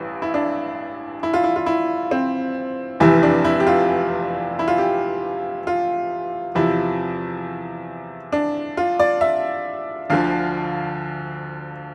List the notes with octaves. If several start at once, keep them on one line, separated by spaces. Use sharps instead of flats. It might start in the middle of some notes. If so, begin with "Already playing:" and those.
Already playing: A1 G2 E3
E4
D4
E4
F4
E4
F4
E4
C4
F1 E2 C3 E3 E4
D4
E4
G4
F4
E4
F4
G4
F4
E2 C3 F3 E4
D4
F4
D5
E5
D2 D3 F3 F5